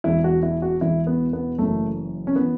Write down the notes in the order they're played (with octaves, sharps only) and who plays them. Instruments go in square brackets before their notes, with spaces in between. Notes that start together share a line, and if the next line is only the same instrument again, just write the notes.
[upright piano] E1 E2 E3 E4
F#4
E4
F#4
E1 E2 E3 E4
B3
B3
F#1 F#2 E3 A3
C#4
E3 B3